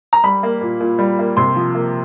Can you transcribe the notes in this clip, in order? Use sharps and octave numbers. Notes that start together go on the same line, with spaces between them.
A#5
G3 B5
A#3
A#2
A#2
G3
A#3
C3 C6
F3
A#3